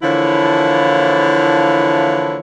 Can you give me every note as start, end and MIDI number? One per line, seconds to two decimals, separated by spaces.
0.03 2.39 50
0.03 2.39 52
0.03 2.39 53
0.03 2.39 58
0.03 2.39 64
0.03 2.39 73